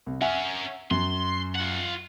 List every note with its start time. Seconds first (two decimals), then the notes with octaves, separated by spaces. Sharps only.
0.06 C2
0.21 C#4 A#4 E5 F#5 G#5
0.91 F#2 C6
1.56 F4 F#5